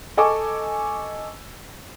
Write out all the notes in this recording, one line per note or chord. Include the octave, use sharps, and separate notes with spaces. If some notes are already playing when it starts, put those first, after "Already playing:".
A4 D#5 G#5 C#6 D6 E6